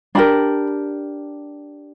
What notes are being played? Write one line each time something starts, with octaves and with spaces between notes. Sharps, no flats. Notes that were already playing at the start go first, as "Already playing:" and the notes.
D4 G4 A#4 B5